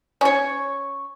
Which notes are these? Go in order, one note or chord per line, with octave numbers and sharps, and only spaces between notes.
C#4 C#5